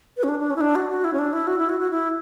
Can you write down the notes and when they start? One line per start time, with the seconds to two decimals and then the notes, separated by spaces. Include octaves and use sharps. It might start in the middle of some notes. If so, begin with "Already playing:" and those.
0.17 B4
0.23 C#4
0.29 D4
0.39 D4
0.50 C#4
0.56 E4
0.61 D4
0.75 F#4
0.90 F#4
1.04 E4
1.13 C#4
1.19 D4
1.33 E4
1.47 F#4
1.58 E4
1.69 F#4
1.80 F#4
1.91 E4